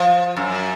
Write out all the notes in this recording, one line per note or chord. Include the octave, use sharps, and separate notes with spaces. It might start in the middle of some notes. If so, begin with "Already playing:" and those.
Already playing: F3
F#2